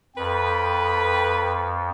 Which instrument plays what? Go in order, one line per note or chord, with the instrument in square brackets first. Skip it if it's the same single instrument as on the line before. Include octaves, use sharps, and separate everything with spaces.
[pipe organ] F2 [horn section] A4 B4 G5